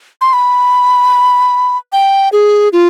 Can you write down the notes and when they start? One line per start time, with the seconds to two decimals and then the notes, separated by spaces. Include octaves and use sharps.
0.21 C6
0.33 B5
1.93 G5
2.33 G#4
2.73 F4